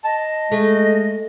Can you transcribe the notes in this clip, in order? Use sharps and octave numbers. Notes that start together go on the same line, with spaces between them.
D#5 A5
G#3 A3